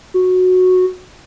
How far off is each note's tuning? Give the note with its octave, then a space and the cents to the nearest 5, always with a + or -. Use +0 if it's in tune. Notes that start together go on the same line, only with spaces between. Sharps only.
F#4 -10